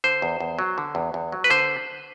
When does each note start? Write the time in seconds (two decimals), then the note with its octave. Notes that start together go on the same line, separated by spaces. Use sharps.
0.04 D3 C5
0.22 E2
0.40 E2
0.59 F#3
0.78 D3
0.95 E2
1.14 E2
1.32 F#3
1.44 B4
1.50 D3 C5